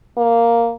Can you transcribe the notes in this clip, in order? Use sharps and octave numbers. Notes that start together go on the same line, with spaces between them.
A#3